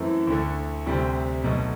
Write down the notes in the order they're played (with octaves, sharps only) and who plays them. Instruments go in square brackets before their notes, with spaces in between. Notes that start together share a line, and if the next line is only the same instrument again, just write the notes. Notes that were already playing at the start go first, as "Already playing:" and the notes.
Already playing: [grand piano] F#2 E3 A3 C4 E4
D2 D3 A3
D2 C3 G3 C4
B1 B2 A3